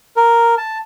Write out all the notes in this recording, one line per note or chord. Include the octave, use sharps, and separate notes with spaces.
A#4
A5